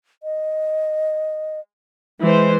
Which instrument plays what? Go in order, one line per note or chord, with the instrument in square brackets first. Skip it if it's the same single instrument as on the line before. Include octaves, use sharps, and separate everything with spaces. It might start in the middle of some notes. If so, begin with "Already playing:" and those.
[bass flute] D#5
[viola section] E3 C5 [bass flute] G#3